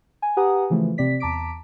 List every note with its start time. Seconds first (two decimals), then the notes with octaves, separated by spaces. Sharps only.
0.22 G#5
0.37 G4 B4 F#5 G#5 A#5 D#6
0.70 C#3 E3 F3 A3
0.98 C3 C4 D5 B6
1.20 E2 A5 A#5 D6 B6 D7